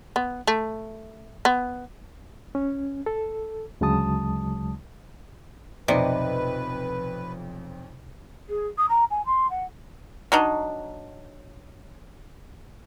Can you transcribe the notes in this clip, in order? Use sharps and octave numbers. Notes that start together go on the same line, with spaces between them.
B3
A3
B3
C#4
A4
D2 C#3 F#3 G#3 A5 D#6
B1 F2 C3 B4 D5 D#5
G#4
D#6
A#5
G#5
C6
F#5
F#3 D4 D#4